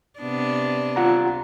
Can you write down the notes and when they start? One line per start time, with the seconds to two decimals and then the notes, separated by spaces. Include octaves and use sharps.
0.20 C3 B3 D4
0.96 F4 F#5 A#5